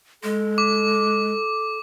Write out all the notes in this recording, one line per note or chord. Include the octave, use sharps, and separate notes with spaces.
G#3 A4
D6